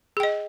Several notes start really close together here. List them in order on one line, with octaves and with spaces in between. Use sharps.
G#4 G5 D#5